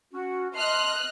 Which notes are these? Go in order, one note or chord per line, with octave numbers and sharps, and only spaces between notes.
C#4 F#4
D#5 E5 A5 C6 F6 F#6